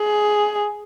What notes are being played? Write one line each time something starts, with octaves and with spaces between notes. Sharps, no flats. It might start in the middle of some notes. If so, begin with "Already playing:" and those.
Already playing: G#4